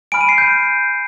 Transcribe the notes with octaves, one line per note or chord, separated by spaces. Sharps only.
G#5 B5 F6 D7
D#7
C7
G6